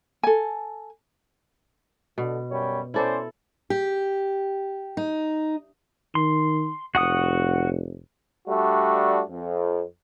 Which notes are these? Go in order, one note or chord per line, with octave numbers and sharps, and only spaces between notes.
A4 G#5
B2 D3
F#2 G3 C#5
C#4 E4 A4 C5 D5
G4
D#4
D#3 C6
F1 F#4 F#5 D#6
G3 A3 D4 F#4
F2